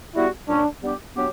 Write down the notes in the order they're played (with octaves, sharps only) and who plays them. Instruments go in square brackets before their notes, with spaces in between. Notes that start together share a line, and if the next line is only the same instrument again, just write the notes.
[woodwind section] G3 B3 F#4 [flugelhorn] E4
[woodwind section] A#2 G3 C#4 [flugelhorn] D4
[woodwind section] G3 B3 D4 G4
F#3 B3 D4 G4